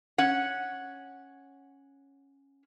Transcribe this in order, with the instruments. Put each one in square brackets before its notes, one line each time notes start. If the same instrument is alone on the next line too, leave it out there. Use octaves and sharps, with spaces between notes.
[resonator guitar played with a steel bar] C#4 F#5